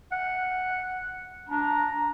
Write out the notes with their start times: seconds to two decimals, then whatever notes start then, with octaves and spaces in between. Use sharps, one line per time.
0.12 F#5
1.49 D4 A#5